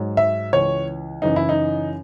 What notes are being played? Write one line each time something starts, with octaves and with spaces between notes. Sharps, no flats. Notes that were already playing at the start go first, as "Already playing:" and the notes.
Already playing: G#2 F#3
E5
C#2 C#3 E3 C#5
F#2 C#3 E3 D#4
E4
D#4